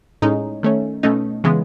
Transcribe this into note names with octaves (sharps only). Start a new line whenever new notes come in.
A2 G#3 C#4 D#4
D#3 A3 C#4
B2 A3 C#4 D#4
C#3 E3 G#3 B3